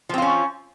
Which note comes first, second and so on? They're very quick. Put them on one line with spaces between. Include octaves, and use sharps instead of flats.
F3 C4 F4 C#4